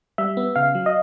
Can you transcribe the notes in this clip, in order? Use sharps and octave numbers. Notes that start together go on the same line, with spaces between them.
G3 E5
B3
C#3 F5
F#3
D#5